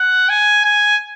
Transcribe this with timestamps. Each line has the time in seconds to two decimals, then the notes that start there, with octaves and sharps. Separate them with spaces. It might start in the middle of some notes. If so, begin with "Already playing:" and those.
Already playing: F#5
0.29 G#5
0.64 G#5